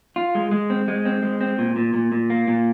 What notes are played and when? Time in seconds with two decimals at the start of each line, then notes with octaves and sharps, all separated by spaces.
0.16 F4
0.35 G#3
0.51 G#3
0.70 C4
0.88 G#3
1.05 C4
1.22 G#3
1.41 C4
1.58 A#2
1.76 A#2
1.94 A#2
2.12 A#2
2.30 A#3
2.47 A#2